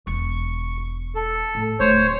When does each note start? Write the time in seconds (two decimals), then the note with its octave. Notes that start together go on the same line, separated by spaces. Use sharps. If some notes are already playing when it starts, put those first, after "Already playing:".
0.07 E1 C#6
1.15 A4
1.55 A2
1.80 D1 A3 C5 C#5